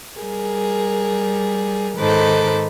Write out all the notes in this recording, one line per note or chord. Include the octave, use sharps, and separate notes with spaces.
G3 G#4 A#4
G#2 D#3 A4 B4 C5 D6